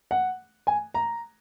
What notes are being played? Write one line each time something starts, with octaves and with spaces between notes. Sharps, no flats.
F#5
G#5
A#5